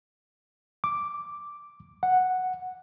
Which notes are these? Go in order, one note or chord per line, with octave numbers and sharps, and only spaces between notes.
D6
F#5